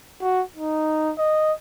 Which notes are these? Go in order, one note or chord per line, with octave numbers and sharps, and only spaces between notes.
F#4
D#4
D#5